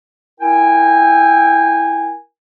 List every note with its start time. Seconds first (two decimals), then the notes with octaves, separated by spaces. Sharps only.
0.41 E4 A#4 G5 G#5